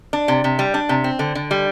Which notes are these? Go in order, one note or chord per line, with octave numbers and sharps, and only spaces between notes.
D4
C3
C3
G3
D4
C3
C4
D3
D3
G3